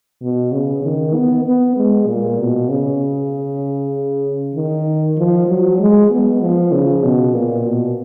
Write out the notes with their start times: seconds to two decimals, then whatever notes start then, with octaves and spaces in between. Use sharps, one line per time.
0.22 B2
0.52 C#3
0.83 D#3
1.14 B3
1.45 B3
1.76 G#3
2.07 A#2
2.38 B2
2.69 C#3
4.55 D#3
5.17 F3
5.47 F#3
5.78 G#3
6.10 B3
6.41 F3
6.72 C#3
7.03 B2
7.34 A#2
7.65 B2